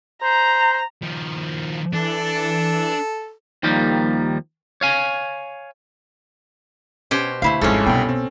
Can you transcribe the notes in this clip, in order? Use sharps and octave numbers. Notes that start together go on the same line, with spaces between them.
C5 A#5
D#3 F3
E3 D4 A4
D#2 D#3 F3 G3 A#3
C#5 F5 G#5
B2 C#4 G4 C5
D2 A3 E4 F5
G#1 F2 G#2 G3 G#3 C#4 A4
C2 G2 B2 G5
C4